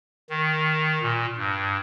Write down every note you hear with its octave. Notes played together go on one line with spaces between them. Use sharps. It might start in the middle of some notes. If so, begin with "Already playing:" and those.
D#3
A#2
G2